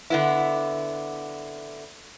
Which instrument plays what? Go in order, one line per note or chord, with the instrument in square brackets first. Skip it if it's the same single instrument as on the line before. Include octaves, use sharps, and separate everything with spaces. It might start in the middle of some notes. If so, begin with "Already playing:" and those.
[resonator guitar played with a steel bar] D3 B3 E4